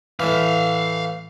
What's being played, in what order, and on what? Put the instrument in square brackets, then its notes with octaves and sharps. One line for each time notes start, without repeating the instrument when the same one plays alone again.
[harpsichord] A2 E3 [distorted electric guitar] E5 F5